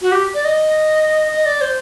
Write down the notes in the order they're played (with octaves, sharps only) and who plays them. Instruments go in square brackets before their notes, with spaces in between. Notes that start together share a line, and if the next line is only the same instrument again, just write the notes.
[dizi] F#4
G4
D5
D#5
D#5
D5
C5